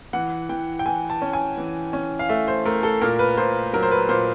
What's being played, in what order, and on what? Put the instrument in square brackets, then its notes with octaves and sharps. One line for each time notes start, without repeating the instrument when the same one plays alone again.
[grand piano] E3 F#5
E3 G5
G5
E3 G#5
A5
C#4
G#5
E3
C#4
F5
A3 E5
C5
A3 A#4
A4
A#2 A#4
B4
A#2 C5
F#3 A#4
C5
B4
A#2 C5